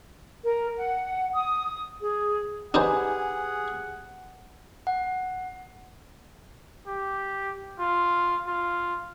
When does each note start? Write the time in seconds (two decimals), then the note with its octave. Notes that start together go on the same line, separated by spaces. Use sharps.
0.44 A#4
0.76 F#5
1.33 D#6
2.01 G#4
2.74 D4 D#4 G4 G#4 B4 C5 F#5 G#5
4.87 F#5
6.87 G4
7.79 F4
8.47 F4